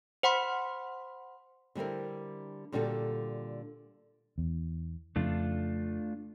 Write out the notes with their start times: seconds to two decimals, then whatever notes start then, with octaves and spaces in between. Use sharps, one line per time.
0.23 C5 F#5 B5 C6
1.75 D3 G3 C4 E4 A#4
2.72 A#2 D3 G3 F#4 G#4 A4
4.38 E2
5.16 F2 C#3 A3 D4 F4